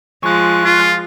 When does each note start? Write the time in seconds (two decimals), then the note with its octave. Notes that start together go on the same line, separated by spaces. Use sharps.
0.23 F3 G#3 C#6 F#6
0.65 F4